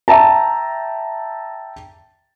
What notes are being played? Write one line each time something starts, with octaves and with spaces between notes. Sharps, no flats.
E5 G5 A5 A#5